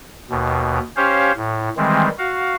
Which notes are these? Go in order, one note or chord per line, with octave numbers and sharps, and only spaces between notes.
D#2 B2
C#4 G4 C5 C#5 F5
A2
D#3 E3 G3 G#3 C4
F#4 F5